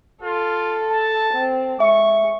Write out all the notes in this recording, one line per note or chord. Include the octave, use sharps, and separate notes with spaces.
F4 A4
A5
C4
G#3 E5 C#6